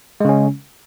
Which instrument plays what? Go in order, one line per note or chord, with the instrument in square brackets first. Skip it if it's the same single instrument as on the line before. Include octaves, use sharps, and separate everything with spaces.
[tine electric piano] G#3
C#3
C#4